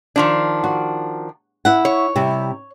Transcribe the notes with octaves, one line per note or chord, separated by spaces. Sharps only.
D#3 F3 D4
F#4
E4 F#5
C#5
C3 G3 E4